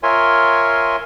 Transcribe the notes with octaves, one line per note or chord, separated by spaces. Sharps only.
F4 A#4 C#5 E5 G#5 C6